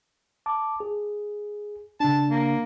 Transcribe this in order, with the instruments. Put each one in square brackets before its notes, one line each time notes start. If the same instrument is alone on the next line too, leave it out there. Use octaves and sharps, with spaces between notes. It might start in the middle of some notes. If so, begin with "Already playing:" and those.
[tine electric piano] A5 D6
G#4
[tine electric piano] C#3 D4 [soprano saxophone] A5
[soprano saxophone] A#3